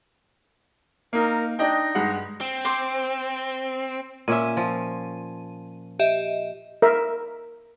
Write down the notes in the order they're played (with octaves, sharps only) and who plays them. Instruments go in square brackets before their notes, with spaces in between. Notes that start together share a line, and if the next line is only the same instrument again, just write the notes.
[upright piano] A#3 D#4 [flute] A#4
[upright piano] D4 D#5 G5 [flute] D#4
[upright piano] G2 G#3 F#5
[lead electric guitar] C4
[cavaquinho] C5 D6
[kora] A#2 C#4 E5 [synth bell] D#7
[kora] F3
[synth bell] G4 D#5 E5
[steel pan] A#4 E5